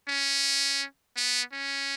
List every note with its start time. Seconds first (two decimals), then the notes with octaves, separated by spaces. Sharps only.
0.08 C#4
1.16 B3
1.53 C#4